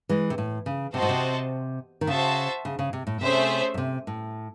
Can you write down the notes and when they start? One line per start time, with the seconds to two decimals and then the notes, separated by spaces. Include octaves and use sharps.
0.09 E3 G#3
0.30 C3
0.38 A2
0.66 C#3
0.94 C3 C4 F#4 C5 D#5 A5
1.02 A2
1.09 C3
2.01 D#3
2.07 C#3 F#4 C5 E5 A5
2.65 C#3
2.79 C#3
2.93 C3
3.07 A2
3.21 C3 A3 C#4 G#4 C5 E5
3.74 A2
3.78 C3
4.07 A2